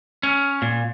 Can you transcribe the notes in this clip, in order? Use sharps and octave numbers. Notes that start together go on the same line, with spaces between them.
C#4
A#2